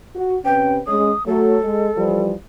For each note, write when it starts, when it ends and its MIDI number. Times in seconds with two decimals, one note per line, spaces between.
0.16 0.37 66
0.45 0.80 48
0.45 0.80 61
0.45 0.80 71
0.45 0.73 79
0.87 1.11 56
0.87 1.11 61
0.87 1.26 87
1.26 1.58 54
1.26 1.58 57
1.26 2.21 69
1.63 1.89 56
1.97 2.33 52
1.97 2.33 53
1.97 2.33 55